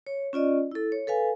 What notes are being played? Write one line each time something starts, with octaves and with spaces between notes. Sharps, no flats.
C#5
C#4 F4 D5 D#5
E4 A4
C#5
A4 B4 F5 G#5